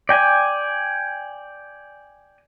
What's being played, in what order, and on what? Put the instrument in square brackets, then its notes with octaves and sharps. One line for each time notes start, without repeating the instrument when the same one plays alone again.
[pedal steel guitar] D5 G5 G#5